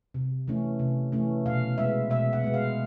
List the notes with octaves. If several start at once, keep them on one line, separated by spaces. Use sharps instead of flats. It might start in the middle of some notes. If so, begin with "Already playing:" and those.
C3
E3 A3 C#4
C3
E3 A3 C#4
B2 F5
G#3 B3 E5
B2 E5
F#5
G#3 B3
F5